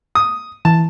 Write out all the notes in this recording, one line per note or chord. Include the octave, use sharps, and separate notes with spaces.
D#6
E3 A5